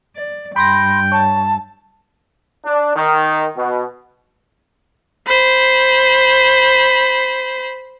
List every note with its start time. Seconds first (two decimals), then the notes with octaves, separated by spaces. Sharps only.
0.16 D5
0.56 G2 G5 B5 C6 A#6
1.12 C#5 A5
2.65 D4
2.96 D#3
3.57 B2
5.27 C5 B5